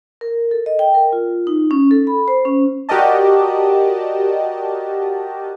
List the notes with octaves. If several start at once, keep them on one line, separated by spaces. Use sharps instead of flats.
A#4
A4
D#5
G5
A#4
F4
D#4
C#4
A4
B5
C5
C#4
F#4 G4 A#4 D5 D#5 A5